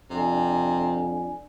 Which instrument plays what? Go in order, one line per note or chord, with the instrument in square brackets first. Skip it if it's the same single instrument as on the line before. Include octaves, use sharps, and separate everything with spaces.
[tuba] F2 [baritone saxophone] C3 [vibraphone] D4 D5 G#5